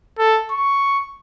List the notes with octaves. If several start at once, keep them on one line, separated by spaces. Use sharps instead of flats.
A4
C#6